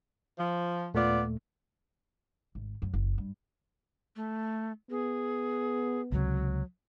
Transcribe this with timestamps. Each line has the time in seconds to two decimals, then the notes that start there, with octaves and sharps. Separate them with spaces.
0.38 F3
0.94 D#2 A#2 A3 B3 F4 D5
2.55 G#1
2.82 F#2
2.94 F#1
3.18 G2
4.16 A3
4.91 B3 G#4
6.12 C#2 C3 F#3